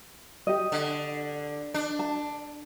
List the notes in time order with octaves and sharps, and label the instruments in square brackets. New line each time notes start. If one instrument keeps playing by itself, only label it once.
[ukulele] G4 D#5
[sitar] D3
D4
[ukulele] A5